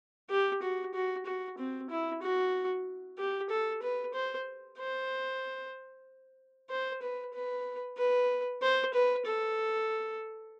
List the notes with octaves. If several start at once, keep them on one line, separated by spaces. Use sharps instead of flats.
G4
F#4
F#4
F#4
C4
E4
F#4
G4
A4
B4
C5
C5
C5
B4
B4
B4
C5
B4
A4